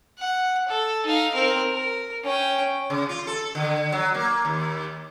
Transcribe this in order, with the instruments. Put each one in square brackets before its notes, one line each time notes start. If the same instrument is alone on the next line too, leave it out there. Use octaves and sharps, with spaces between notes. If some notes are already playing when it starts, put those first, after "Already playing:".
[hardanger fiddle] F#5
A4
D#4 F5
C4 A#4
A#4
C#4 G5
[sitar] C#3
F4
A4
D3
F#3
A#3
D#2